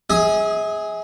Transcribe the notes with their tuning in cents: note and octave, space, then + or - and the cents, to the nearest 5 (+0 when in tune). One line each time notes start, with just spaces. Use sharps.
G#4 +0 E5 -45 D#6 +0